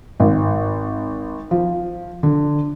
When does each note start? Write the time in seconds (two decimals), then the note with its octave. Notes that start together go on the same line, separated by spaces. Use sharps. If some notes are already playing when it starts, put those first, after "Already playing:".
0.20 G#1
1.51 F3
2.23 D3